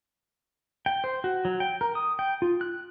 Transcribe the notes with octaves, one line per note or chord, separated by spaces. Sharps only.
G5
C5
F#4
F#3
G5
A#4
D#6
G5
F4
F#6